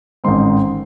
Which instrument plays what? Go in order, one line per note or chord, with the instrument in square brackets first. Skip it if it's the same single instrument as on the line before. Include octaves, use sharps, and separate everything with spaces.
[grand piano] A1 G#2 D#3 G#3 C4 C6